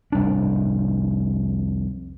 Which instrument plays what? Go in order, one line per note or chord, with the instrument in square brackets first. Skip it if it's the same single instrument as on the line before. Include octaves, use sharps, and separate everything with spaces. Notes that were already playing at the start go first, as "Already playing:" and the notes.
[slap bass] F1 C2 D4